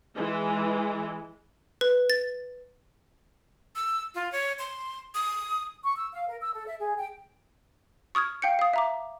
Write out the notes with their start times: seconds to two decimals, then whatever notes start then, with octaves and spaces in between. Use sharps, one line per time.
0.16 E3 G#3
1.81 B4
2.10 A6
3.76 E6
4.15 F4
4.32 C#5
4.59 C6
5.15 D#6
5.83 C#6
5.96 E6
6.11 F5
6.27 A#4
6.40 E6
6.53 A4
6.66 E5
6.80 G#4
6.97 G5
8.15 C#6 D#6 F6 G#6
8.42 F5 G5 G6 C#7
8.59 F5 D#6
8.74 E5 A#5 D6